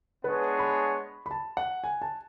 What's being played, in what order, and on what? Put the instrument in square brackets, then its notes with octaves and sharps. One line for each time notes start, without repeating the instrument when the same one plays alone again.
[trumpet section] G#3 B3 D4 G#4 C#5 [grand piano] B4
[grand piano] B5
B5
A5
F#5
G#5
A5